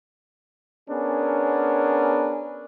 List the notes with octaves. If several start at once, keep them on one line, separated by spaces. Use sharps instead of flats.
B3 C#4 D4 G#4 A#4